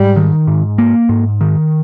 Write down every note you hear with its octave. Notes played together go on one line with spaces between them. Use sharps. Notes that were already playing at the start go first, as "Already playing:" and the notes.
Already playing: G#2 G3
D#3
G#2
A#3
G#2
D#3